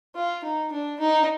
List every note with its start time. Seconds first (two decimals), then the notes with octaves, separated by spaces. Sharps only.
0.15 F4
0.44 D#4
0.72 D4
1.00 D#4